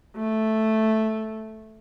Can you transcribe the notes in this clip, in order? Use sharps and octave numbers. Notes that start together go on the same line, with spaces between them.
A3